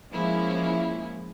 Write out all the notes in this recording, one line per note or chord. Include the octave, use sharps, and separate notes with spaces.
F3 G#3 A#3 C#4 E4